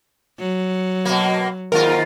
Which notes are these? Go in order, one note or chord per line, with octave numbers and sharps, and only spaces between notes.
F#3
B2 A#3
D#2 G#2 F4 A#4